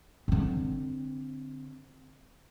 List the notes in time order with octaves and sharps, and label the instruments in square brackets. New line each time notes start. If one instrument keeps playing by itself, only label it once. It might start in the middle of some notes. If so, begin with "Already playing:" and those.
[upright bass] D3 C4